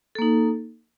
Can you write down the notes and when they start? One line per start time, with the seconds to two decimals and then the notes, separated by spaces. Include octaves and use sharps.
0.15 A4
0.19 A#3
0.22 D#4